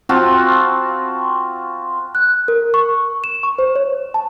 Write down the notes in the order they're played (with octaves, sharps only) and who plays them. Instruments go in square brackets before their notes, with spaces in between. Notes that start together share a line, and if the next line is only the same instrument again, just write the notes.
[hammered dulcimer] C4 F4 F#4 A5
[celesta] F#6
A#4
C#6
E7
C#6
C5
C#5
A5